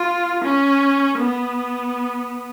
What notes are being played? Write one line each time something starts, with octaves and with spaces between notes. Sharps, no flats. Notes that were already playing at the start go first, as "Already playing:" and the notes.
Already playing: F4
C#4
B3